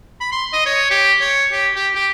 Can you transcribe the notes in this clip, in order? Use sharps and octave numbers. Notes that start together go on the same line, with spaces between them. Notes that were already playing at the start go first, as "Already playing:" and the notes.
B5
C6
D#5
C#5
G4
C#5
G4
G4
G4